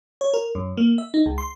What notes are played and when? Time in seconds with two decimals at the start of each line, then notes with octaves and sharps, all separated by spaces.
0.21 C#5
0.34 A#4
0.55 F#2
0.77 A#3
0.98 E5
1.14 D#4
1.26 C#2
1.38 C6